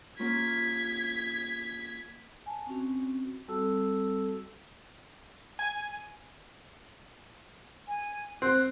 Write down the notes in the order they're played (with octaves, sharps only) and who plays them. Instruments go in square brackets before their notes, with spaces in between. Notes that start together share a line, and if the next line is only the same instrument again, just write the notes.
[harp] A#3 C#4 F4 [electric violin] G#6 B6
[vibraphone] G#5 A5
C4 C#4 F#4
G3 C4 F#4 A4 A5 E6
[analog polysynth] G#5
[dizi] G#5
[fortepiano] C4 [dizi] F#6